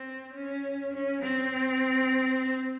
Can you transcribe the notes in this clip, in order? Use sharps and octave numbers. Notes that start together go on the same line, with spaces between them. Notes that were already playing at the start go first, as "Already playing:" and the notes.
Already playing: C4
C#4
C#4
C4